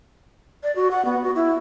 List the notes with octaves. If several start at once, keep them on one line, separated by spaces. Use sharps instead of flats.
D5
F#4
F#5
B3
F#4
E4